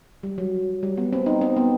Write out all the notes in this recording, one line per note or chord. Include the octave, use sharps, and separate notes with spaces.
G3
F#3
G3
B3
C4
D#4
C4
B3